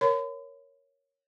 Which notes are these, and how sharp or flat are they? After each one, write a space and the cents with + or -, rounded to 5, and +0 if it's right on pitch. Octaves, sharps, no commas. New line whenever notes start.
A#4 +5 C#5 +0 B5 +45